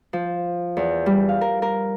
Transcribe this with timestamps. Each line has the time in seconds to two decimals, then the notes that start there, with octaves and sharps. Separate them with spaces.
0.13 F3
0.77 E2
1.06 G3
1.29 F5
1.41 A#4
1.62 A#4